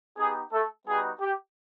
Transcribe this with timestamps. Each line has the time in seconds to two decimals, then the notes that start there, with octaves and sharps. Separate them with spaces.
0.18 B3 D#4 G4 G#4
0.52 A3 A4
0.87 G3 B3 D#4 F#4 G#4
1.21 G4